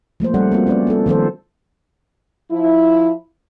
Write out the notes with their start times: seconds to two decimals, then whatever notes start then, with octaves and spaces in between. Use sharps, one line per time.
0.20 F3 A3 A#3 C5
0.34 G3 C#4 A4 D5 F#5
0.52 A#3 C4 F4 F#4
0.67 B3 C#4 C#5 D5
0.87 B3 F4 A4
1.06 D#3 F3 A4 C5
2.51 F3 E4